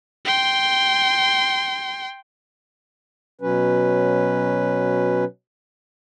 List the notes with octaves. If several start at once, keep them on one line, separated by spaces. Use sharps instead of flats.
G5 C6
B2 F#3 C#4 B4